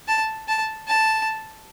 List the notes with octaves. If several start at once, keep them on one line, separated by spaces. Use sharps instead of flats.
A5
A5
A5